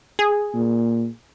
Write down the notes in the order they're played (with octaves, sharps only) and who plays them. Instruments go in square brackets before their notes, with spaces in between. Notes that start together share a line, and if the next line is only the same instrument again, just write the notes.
[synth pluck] G#4
[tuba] A#2